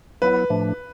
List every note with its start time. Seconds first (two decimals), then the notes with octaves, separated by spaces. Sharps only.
0.22 F#3 B3 E4 B4
0.50 A2 F3 A3 D4